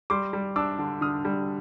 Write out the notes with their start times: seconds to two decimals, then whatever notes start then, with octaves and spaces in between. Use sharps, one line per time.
0.10 G3 C6 D6
0.33 G3
0.56 D4 D6 E6
0.79 D3
1.01 D3 D#6 F6
1.25 G3